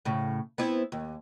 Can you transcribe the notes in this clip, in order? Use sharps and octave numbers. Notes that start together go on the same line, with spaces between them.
A2 C#3
B3 C4 E4
D#2